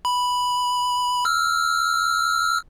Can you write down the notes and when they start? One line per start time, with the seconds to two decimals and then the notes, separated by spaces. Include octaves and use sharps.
0.05 B5
1.25 E6 F6